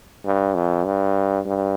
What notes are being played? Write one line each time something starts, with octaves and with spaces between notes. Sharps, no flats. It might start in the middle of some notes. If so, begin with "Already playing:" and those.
G2
F2
G2
G2